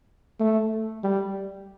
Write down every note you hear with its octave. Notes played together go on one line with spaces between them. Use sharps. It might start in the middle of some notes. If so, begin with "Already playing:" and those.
A3
G3